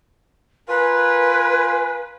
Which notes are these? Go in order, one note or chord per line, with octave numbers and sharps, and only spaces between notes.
F4 A#4 B4 G#5